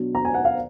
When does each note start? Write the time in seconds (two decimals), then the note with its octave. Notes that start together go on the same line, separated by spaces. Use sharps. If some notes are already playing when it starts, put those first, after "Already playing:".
Already playing: B2 F#3 D4
0.15 A#5
0.25 G#5
0.34 F#5
0.45 F5